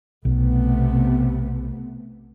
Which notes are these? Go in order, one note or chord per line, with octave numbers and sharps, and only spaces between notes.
B1 C3 A3 B3